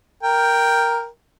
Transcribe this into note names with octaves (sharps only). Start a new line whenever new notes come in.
A#4 G5